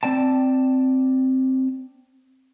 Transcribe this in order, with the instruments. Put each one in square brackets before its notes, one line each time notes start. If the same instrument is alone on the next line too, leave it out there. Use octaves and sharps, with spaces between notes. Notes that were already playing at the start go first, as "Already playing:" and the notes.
[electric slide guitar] C4 D5 G5 A5